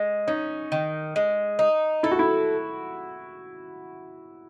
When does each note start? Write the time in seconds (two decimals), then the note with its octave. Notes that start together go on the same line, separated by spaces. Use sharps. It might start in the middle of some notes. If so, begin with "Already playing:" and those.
Already playing: G#3
0.27 C#4 D#4
0.72 D#3
1.16 G#3
1.59 D#4
2.03 E4 A4
2.11 F#4
2.19 E4